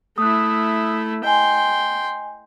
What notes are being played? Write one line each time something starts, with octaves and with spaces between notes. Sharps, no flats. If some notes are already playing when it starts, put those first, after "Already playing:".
A3 E4 D#6 F#6
D#5 G5 G#5 C6